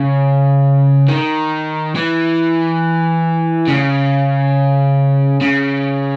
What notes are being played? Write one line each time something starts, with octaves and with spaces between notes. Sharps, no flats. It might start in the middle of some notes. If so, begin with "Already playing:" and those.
Already playing: C#3
D#3
E3
C#3
C#3